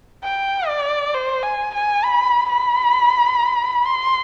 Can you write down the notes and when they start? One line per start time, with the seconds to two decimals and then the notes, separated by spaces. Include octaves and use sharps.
0.23 G5
0.68 D5
1.14 C5
1.43 G#5
1.74 G#5
2.04 B5
2.49 B5
3.85 C6